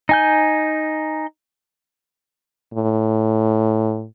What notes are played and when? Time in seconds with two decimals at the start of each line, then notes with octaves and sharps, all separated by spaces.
0.09 D#4 G#5 G6
2.74 A2